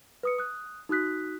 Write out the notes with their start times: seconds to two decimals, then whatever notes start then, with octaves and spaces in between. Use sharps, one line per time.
0.23 B4 D#6 C#7
0.39 D#6 F#6
0.89 D#4 F#4 D#6 F#6 B6